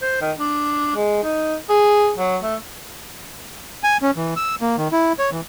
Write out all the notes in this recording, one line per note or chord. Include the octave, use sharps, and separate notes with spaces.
C5
D#3
D4
G#3
D#4
G#4
F#3
A3
G#5
C#4
E3
E6
A#3
D#3
E4
C#5
E3